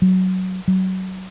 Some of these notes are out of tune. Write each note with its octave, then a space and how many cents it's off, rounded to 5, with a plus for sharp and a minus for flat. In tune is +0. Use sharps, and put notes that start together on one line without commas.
F#3 +10
F#3 +20